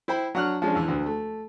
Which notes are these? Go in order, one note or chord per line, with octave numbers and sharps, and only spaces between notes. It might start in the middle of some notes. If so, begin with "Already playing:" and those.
E4 C5 G5 B5
F#3 D4 F#5 C#6 F6 F#6
F3 G#3 C#4 D4
E2 E3
D2 D3
A3